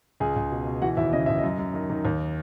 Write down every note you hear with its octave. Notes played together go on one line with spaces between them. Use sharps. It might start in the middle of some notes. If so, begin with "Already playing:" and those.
C#2 G#4 G#5
C#2
B2
B2
E3 F#4 F#5
D#2 E4 E5
C#3 D#5
D#2 E5
D#5
F#2
F#2
D#3
D#3
D#2